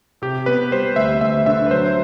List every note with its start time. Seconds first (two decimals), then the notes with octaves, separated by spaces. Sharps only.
0.22 C3 G4
0.46 B3 B4
0.72 G3 C5
0.96 D2 E5
1.21 D2 E5
1.46 D3 E5
1.66 B4
1.71 F#3 C5